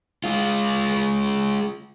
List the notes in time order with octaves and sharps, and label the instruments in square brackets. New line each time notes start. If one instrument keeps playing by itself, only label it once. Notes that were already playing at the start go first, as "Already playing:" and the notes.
[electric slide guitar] G#3 F4